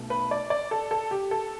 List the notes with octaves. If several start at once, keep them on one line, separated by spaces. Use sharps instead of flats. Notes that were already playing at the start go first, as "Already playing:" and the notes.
Already playing: B1 B2 A3
B4
D5
D5
A4
A4
G4
A4